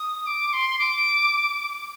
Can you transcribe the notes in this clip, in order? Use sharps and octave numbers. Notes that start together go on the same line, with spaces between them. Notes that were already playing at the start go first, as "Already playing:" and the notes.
Already playing: D#6
D6
C6
D6